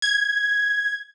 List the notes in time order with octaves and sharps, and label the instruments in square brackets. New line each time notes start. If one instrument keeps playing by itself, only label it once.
[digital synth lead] G#6